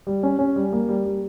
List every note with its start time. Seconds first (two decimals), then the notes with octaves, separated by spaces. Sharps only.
0.07 G3
0.23 C#4
0.39 C#4
0.56 G3
0.73 A#3
0.89 G3
1.05 G3